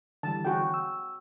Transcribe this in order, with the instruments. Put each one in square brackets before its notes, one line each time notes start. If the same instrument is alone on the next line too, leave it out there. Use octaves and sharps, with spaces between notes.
[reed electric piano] D3 E3 G3 [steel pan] A5
[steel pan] F#4 G#4 G5
[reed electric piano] E6